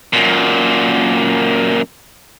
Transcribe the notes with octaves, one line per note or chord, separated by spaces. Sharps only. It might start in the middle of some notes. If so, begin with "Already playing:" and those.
F#2 A#2